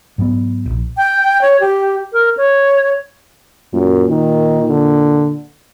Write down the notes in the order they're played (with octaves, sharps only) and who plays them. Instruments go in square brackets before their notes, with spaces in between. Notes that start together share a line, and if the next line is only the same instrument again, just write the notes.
[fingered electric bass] G#2 F#3 G#3 B3
D1 A#1
[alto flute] G5
C#5
G4
A#4
C#5
[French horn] F#2 [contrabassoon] A#2
[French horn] D#3
D3